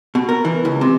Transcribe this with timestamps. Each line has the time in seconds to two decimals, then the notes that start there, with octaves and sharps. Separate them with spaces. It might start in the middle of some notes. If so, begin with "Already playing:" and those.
0.15 B2
0.29 A#4
0.45 E3
0.65 C#2
0.81 C3